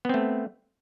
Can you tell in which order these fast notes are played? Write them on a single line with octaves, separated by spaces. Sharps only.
B3 C4 A3